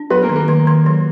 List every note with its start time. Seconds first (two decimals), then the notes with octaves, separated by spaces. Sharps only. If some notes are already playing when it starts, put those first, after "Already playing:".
Already playing: D4
0.10 F#3 B3 B4
0.22 A#3 A#4
0.29 D#3
0.36 A#3 A#4
0.48 D#3
0.67 D#3
0.86 F#3